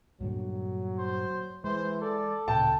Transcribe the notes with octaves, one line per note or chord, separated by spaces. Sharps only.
G2 A#2 D3 F#3
C5
E3 G#3 C5
A4 D5
D1 A#2 C#3 G5 A5